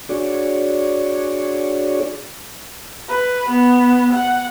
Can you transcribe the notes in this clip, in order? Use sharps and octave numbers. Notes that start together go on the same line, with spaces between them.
D4 F#4 G#4 C#5 D5
B4
B3
F#5